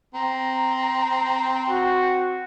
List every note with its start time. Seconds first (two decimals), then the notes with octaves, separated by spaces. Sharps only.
0.14 C4 A#5
1.69 F#4